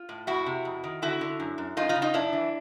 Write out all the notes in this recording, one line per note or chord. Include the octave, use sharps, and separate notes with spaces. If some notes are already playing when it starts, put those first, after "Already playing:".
Already playing: F4
A2
F2 E4 F#4
C3
F2
D#3
D3 E4 F#4
D3
F#2
F#2
F#2 D#4 F4
D#4 F4
C#3
D#4 F4
F#2 D4 E4
E3